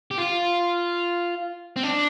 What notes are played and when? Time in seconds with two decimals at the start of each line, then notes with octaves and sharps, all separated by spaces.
0.11 G4
0.18 F4
1.76 C4
1.83 D4